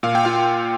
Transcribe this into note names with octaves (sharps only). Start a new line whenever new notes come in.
A#2 F5
G5
F4 F5